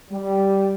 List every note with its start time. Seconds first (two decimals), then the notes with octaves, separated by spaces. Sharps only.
0.11 G3